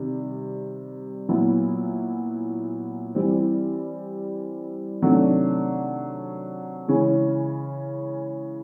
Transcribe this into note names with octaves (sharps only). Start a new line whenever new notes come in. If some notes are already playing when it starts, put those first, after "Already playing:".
Already playing: C3 D#3 G3
A#2 F#3 B3 E4
E3 G3 C4
C3 D#3 F#3 A3 D4
C#3 E3 G#3 C#4